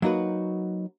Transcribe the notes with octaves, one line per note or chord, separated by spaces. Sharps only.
F#3 A#3 D#4 F#4 B4